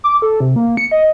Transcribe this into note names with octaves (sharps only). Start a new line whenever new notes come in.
D6
A4
C3
A#3
C#7
D#5